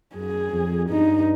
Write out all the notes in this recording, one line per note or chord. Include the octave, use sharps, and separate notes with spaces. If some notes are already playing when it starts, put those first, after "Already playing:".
F#2 G#4
F2
G2 D#4